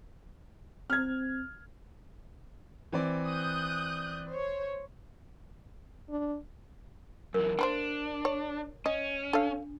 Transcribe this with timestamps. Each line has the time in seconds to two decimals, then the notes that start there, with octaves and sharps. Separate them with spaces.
0.90 C4 F6 G#6
2.92 E3 C4 D5
3.27 D#6 F#6 G6
4.28 C5 C#5
6.10 D4
7.34 F#2 E3 A#4
7.59 A#3 D4 B4 C5
8.25 C#5
8.86 C#4 D#5
9.33 D4 A4 F5